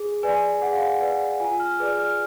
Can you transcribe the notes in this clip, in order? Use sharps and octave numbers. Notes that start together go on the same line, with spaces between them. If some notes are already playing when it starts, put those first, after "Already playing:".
Already playing: G#4
B4 D5 G#5
G#4 F#5
F5
F#5
B4 D5 F#5
F#5
F4 G#5
F6
G#4 B4 D5 F6
F6